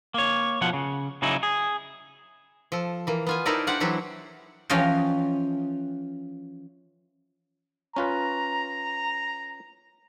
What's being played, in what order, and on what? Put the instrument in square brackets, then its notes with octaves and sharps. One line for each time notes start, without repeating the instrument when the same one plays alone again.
[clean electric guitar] A#3 C#5
B2 F3 F4 F#5
C#3
C#3 F#3 D#4 E4
G#4
[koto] F3 A4
E3 A#3
B3 F4 G#5
D#4 E4 A4 A#4 C5 D5
D4 G4 C5 D5 F#5
E3 F#3 E4 G4 A4 C5
[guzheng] E3 F3 C#4 F4 D#5 G5
[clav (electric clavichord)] C#4 F4 B4 [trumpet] A#5